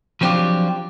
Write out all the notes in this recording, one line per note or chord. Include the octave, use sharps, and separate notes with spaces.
F3 F#3 C4 D4 F4 G4